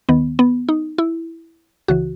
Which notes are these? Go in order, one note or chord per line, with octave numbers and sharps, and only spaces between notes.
D#2 D#3 B3
B3
D#4
E4
C#2 C#3 E3 F#4